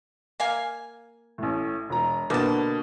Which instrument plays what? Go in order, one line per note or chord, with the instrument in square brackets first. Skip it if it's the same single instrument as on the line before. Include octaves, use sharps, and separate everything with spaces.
[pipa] A#3 F5 G#5
[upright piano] A1 A2
E1 A#5
[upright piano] B2 D3 A#3 [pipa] G3 A5